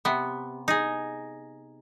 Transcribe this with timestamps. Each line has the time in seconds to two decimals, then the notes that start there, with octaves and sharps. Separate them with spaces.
0.05 C3 B3
0.68 D#4 G#4